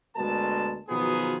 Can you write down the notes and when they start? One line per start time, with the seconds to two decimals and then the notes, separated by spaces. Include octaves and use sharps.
0.17 D2 B2 G#3 A#4 A5
0.89 B2 D#3 F3 F#3 B3 G#4